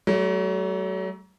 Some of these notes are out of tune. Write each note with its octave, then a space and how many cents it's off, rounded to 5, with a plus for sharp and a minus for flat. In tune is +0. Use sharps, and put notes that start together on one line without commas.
F#3 +35 A3 -20